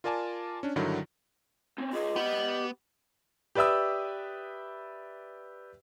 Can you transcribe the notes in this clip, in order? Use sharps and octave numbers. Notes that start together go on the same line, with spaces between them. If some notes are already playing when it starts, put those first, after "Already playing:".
F4 A#4 D5 G#5 A5 D6
C#4 D4
G2 D3 D#3 F#3 D#4 E4
C4 C#4
F4 G#4 D#5
B3 G4 B5
G4 B4 D5 E5 D#6 E6